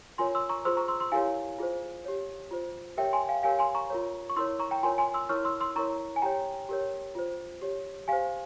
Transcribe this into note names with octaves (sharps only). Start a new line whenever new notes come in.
F4 A#4 C#5 G#5 C6
C6 E6
A#5 C#6
F4 G#4 C5 C6 E6
A#5 C#6
C6 E6
C6 E6
E4 G4 A#4 C#5 F5 G#5
F4 G#4 C5
G4 C#5
F4 C5
G4 A#4 C#5 E5 G5
G#5 C6
F5 G#5
G4 A#4 C#5 F5 G#5
G#5 C6
A#5 C#6
F4 A#4 C#5
C#6
E4 A#4 C#5 C6 E6
A#5 C#6
G5 A#5
F4 A#4 C#5 G#5 C6
G#5 C6
C6 E6
E4 A#4 C#5 C#6 F6
C6 E6
C6 E6
E4 A#4 C#5 A#5 C#6
G#5
G4 C#5 G5 A#5
G4 A#4 C#5
F4 C5
G4 C#5
G4 C5 F5 G#5